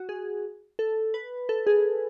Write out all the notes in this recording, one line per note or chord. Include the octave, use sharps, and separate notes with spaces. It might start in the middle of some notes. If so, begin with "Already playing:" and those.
Already playing: F#4
G#4
A4
B4
A4
G#4